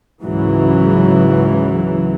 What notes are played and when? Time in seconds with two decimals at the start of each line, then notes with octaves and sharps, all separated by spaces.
0.22 C#2 G#2 C#3 E3 F#3